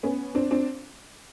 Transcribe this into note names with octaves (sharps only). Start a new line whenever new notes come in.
B3 C#4
C4 D4
C4 D4